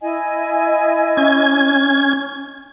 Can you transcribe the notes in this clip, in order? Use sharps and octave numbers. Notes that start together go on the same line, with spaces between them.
E4 D#5 G#5
C#4 G#6